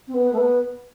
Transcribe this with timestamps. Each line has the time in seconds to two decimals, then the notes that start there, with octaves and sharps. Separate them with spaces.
0.07 C4
0.14 B3
0.33 A3
0.38 B3